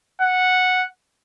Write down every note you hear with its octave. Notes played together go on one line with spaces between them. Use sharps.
F#5